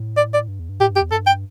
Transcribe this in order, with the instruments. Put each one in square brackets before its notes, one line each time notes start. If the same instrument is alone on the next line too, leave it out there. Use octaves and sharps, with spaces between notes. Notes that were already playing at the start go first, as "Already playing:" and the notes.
Already playing: [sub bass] A2
[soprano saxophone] D5
D5
[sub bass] G2
E2
G2
[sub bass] A2 [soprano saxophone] G4
[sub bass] G2
[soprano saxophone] G4
[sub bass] E2
[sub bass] G2 [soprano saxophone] A4
[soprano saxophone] G5